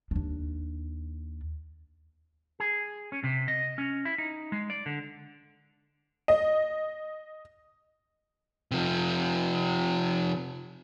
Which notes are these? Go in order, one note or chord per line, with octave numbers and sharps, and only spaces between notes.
D#2 D4
G#4
C#4
C3
D#5
C#4
E4
D#4
G#3
D5
D3
D#5
C3 F3